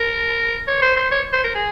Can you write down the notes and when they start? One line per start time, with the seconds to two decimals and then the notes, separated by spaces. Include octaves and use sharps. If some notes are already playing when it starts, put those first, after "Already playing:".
Already playing: A#4
0.67 C#5
0.82 C5
0.96 C5
1.11 C#5
1.33 C5
1.44 A#4
1.55 G#4